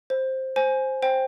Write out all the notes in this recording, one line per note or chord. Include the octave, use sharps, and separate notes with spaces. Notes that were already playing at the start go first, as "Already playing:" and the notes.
C5
C5 G#5
C5 G5